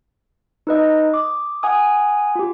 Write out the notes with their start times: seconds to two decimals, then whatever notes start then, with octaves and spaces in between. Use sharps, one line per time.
0.67 D#4 B4 D#5
1.14 D6 D#6
1.63 F#5 G#5 D#6
2.35 F4 G4